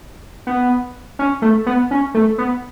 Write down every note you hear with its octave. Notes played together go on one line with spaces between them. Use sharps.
B3
C#4
A3
B3
C#4
A3
B3